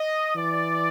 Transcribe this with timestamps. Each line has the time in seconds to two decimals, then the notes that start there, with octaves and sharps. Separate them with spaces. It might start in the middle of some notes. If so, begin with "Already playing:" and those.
Already playing: D#5
0.36 E3 D5